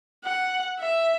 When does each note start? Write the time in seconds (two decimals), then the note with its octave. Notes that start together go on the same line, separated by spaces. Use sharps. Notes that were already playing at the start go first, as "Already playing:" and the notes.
0.25 F#5
0.79 E5